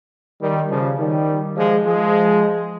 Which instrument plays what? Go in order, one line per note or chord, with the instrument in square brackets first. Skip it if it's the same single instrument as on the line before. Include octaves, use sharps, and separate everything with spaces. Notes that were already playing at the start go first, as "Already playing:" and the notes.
[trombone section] D#3 G3
C#3 F3
D#3 G3
F3 G#3
F3 G#3